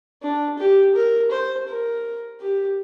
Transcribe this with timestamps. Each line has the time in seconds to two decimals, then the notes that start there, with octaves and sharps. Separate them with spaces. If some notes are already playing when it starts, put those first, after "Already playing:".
0.22 D4
0.59 G4
0.95 A#4
1.31 C5
1.68 A#4
2.41 G4